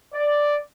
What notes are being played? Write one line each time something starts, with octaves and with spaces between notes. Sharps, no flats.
D5